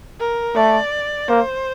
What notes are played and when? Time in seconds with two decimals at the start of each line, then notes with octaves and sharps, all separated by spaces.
0.20 A#4
0.56 A3 D5
1.28 A#3 C5